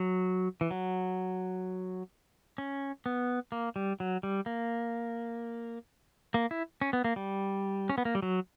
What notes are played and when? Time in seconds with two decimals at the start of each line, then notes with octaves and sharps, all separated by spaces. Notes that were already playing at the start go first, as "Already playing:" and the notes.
Already playing: F#3
0.61 E3
0.71 F#3
2.58 C#4
3.06 B3
3.52 A#3
3.76 G3
4.00 F#3
4.23 G3
4.46 A#3
6.34 A#3
6.51 E4
6.81 C#4
6.93 B3
7.05 A#3
7.16 G3
7.90 C#4
7.98 B3
8.05 A#3
8.15 G3
8.22 F#3